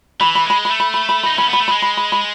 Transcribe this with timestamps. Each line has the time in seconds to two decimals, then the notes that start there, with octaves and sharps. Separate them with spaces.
0.20 E3 B5
0.35 B5
0.46 G#3 B5
0.65 B5
0.70 A3
0.80 B5
0.94 B5
1.09 B5
1.23 B5
1.26 D#4
1.38 C#4 B5
1.48 B3 B5
1.60 A3
1.68 B5
1.71 G#3
1.82 B5
1.97 B5
2.12 B5